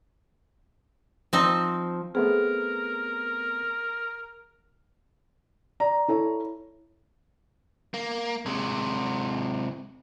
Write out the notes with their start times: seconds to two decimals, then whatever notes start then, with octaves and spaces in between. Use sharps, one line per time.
1.33 F3 C4 D#4
2.15 A3 B3 C4 G#4 A#4
5.80 D5 A#5
6.08 E4 A4 C#5
7.94 A#3
8.46 C3 G#3